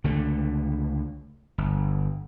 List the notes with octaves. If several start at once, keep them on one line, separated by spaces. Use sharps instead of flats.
C#2 D3 A3
G1